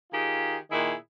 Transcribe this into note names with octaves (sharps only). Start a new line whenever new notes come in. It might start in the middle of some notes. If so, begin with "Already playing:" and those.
D#3 F4 G4 G#4
A#2 D#3 E4 G#4